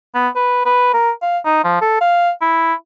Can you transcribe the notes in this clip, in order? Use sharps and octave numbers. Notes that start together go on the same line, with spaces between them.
B3
B4
B4
A#4
F5
D#4
F3
A4
F5
E4